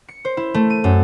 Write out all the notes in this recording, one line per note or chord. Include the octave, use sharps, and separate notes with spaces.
C#7
C5
E4
A3
D#7
F#2